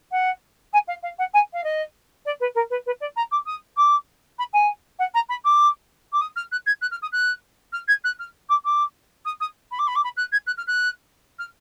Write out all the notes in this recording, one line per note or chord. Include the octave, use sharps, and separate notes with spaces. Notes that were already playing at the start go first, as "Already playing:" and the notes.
F#5
G#5
F5
F5
F#5
G#5
F5
D#5
D5
B4
A#4
B4
B4
D5
A#5
D6
D#6
D6
B5
G#5
F#5
A#5
B5
D6
D6
D#6
F6
F#6
G#6
F#6
F6
D#6
F#6
F6
G#6
F#6
F6
D6
D6
D#6
D#6
B5
D6
B5
D6
B5
F#6
G#6
F#6
F6
F#6
F6